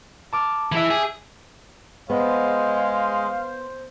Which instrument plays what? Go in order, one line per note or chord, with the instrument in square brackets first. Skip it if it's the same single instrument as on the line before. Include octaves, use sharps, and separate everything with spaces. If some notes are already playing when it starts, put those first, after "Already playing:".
[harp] A5 D6 F6
[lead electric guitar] E3 E4 [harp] G#4 E5
[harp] G4 [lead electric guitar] G#4
[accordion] G#3 [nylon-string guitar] B3 [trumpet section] C5 [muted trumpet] F5